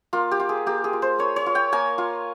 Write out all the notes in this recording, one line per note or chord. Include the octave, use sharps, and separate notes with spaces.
A#3 F4
G4
F4
G#4
A#3 G4
G#4
F4
C5
A#3 C#5
C#5
F4
G5
A#3 G#5
F4